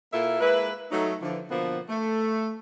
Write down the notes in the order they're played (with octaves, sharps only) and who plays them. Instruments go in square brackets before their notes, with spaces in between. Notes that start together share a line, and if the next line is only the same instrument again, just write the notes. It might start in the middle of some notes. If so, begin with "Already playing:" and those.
[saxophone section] A#2 A#3 E4 F4 A4 E5
G#3 A#3 E4 B4
F#3 A3 D#4
D3 E3 F3
B2 D3 F3 A#3 B3
A3